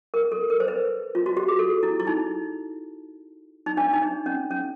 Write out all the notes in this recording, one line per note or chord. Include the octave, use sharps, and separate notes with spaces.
A#4
A4
A#4
C5
B4
F4
F#4
G4
G#4
A4
E4
E4
D#4
D#4
D4
D#4
D4
C#4
C#4